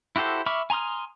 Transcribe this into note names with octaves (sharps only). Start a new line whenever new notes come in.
E4 F#4 G4 A4 C5
E5 B5 C#6 D6 F6
G#5 A#5 C6 D#6 F6